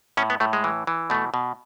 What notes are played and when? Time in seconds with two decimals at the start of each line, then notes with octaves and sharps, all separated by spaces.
0.17 A2 C#4
0.30 B3
0.40 A2 A3
0.53 G#3
0.64 E3
0.87 E3
1.10 B2 A3
1.34 B2